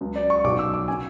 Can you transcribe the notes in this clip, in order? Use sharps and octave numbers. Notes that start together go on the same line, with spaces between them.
C#2 C#3 F#3
D5
C#6
B1 B2 F#3 D6
E6
D6
C#3 G#5